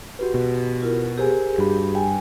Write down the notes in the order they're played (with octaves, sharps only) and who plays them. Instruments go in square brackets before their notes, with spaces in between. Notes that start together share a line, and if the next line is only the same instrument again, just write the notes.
[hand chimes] F#4 G4 B4
[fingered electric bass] B2
[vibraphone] E4 F4 A#4
[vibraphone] G4 G#4 [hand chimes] A#4 C5 G#5
[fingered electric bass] G2 [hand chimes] F#4 B5
[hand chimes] G5 [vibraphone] G#5